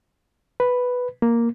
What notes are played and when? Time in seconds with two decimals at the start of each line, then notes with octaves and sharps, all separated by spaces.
0.60 B4
1.22 A#3